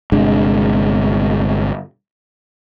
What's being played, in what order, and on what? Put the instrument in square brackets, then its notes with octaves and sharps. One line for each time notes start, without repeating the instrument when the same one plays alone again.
[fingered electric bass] G1 C3 G#3 D4